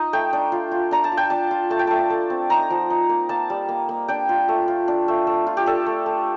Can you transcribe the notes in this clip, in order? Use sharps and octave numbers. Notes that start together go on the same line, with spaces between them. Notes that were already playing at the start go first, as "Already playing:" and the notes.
Already playing: D#4 F4 D#5
A3 G5
D4
F4
F4
D4 A#5
A5
F4
G5
D4 A5
F4
A3 A5
G5
A3 A5
A3
C4
D#4 A#5
F3
D#4
A#3
A#3 A5
G3
A#3
A#3
D4 G5
F4
A3
F4
D4
A3
A3
F4
G4
D4 A4
A3
A3